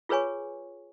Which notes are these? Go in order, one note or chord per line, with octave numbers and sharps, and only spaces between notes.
F4 G#4 B4 C#5 G#5 C#6